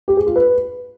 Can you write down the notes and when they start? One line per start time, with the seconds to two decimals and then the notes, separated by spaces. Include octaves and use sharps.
0.08 G4
0.17 G#4
0.26 F4
0.36 B4